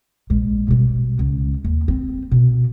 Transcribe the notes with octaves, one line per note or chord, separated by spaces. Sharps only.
A#1 G#3
B2 G3
C#2
D#2
C4
B2